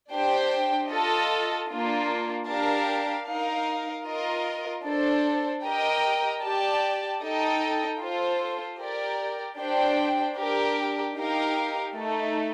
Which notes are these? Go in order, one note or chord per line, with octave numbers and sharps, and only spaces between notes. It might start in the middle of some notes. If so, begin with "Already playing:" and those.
D4 G4 C5 G5
F4 A4 D#5 A5
A#3 D4 F4
D4 G4 A#4 F5 A5
D#4 A#4 F5
F4 A#4 D#5
D4 A4 C5
G4 A#4 D#5 G5
G4 D5 A5
D#4 A4 D#5 G5
F4 A4 C5
G4 A#4 D5
D4 G4 C5 G5
D4 G4 A#4
D#4 G4 A#4 F5
A3 D#4 A4